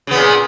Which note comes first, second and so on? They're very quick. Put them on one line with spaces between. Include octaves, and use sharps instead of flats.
C#3 B3 A#2